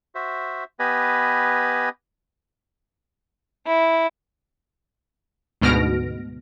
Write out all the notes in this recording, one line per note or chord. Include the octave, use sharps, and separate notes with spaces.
F#4 C5 E5
B3 G4 B4 D#5 G#5
E4
D2 G#2 B2 F6 A#6 D7